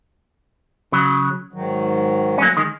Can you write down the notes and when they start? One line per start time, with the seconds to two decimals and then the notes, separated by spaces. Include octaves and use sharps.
0.92 C#3 F#3
1.53 G#2 D#3 F#3
2.38 C#4
2.42 F#3 A#3
2.57 D#3 G#3